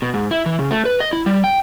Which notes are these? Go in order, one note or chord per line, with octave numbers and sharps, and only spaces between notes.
B2
G#2
E4
E3
C#3
A3
B4
D#5
E4
G3
G5